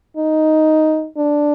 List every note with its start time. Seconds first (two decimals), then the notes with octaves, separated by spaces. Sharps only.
0.17 D#4
1.17 D4